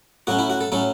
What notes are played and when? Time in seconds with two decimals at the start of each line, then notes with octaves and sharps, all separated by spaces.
0.27 A2 F#3 C#4 F#4
0.39 E4
0.50 F#4
0.61 A4
0.72 A2 F#3 C#4 A4